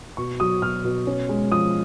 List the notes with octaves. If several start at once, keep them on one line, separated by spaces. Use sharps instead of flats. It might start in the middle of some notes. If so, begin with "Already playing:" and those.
B2 C#6
F#3 D#6
B2 F6
B2
C#4
G#3
F3 D#6